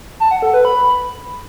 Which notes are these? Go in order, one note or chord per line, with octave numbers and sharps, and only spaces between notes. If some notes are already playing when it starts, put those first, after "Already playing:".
A5
F#5
A4
B4
B5